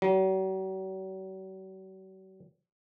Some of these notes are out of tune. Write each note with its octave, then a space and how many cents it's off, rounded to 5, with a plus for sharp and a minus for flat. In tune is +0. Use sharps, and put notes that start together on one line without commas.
F#3 +45